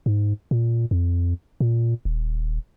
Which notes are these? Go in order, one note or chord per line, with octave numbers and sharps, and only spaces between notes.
G#2
A#2
F2
A#2
D#1